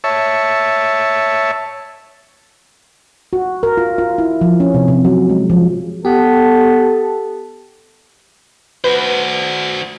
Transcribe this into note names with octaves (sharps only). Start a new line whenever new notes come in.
C#5 E5 A5
F#4
A#4
F4
F4
E4
F3
C#4
C3
C3
F#3
G#3
F3
B3 G4 A4
F#4 B4 C5